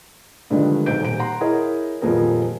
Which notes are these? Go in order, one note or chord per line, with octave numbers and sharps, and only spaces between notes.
G2 D3 D#3 F3 G#3
B1 G#2 C4 G6 D7
D#1 D7
F#5 A#5 C6
E4 G#4 A#4 C#5 D#5
D#1 F2 F3 B3 G#4 A#4